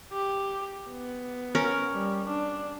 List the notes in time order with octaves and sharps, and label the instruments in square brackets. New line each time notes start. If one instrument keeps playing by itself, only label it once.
[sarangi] G4
B3
[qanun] C#4 A#4
[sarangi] G3
D4